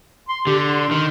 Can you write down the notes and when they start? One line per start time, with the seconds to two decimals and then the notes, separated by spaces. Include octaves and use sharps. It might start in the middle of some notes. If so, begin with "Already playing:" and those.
0.29 C6
0.47 D3 G4
0.59 C6
0.91 D#3